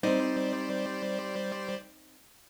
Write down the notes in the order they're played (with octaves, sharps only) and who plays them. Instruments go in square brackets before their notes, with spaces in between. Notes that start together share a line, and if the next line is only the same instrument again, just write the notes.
[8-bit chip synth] G3 C5 D5 [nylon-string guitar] C4 D#4